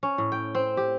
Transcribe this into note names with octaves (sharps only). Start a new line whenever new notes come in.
C#4
A2
G5
C4
G4